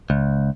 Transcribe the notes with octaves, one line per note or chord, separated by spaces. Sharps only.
C#2